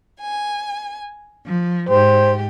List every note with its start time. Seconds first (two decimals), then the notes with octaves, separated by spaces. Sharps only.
0.21 G#5
1.45 F3
1.89 G#2 G4 C5